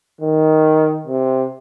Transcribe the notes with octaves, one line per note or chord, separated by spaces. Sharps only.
D#3
C3